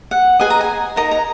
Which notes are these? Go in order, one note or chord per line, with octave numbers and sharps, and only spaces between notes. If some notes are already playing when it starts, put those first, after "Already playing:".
F#5
G#4 B4 D#5 G#5
A#5
G#5
D#4 A#4 D#5 A#5
A#5